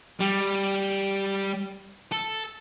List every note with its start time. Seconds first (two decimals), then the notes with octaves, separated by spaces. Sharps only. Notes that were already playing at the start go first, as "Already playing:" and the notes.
0.20 G3
2.12 A4